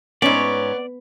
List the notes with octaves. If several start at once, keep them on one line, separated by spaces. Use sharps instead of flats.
G#2 B3 C#4 C#5 D5